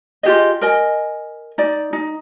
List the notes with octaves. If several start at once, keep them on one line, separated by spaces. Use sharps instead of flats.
F4 G4 G#4 D#5
A#4 D#5 G#5
D#4 D5
D#4